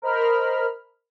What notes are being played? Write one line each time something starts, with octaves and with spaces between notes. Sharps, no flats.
A#4 C5 D#5 B5 F6